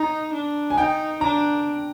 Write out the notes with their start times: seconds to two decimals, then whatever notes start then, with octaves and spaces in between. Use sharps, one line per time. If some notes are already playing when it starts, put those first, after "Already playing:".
Already playing: D#4 A#5
0.33 D4
0.70 G#5
0.77 D#4 G5
1.21 D4 A#5